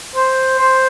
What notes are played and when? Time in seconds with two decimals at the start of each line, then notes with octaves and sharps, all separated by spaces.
0.16 C5
0.59 C5